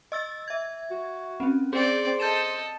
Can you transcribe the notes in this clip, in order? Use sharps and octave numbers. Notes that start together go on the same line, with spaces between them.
D#5 E6 A6
E5 G#6
F#4
C4 C#4
C4 G#4 C5 D5
A4 D#5 G6 A6 E7